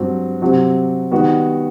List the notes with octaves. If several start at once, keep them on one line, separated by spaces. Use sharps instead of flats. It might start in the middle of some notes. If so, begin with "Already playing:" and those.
Already playing: G2 F#3 C4 F#4
C3 F#3 C4 F#4
D#3 G3 B3 F#4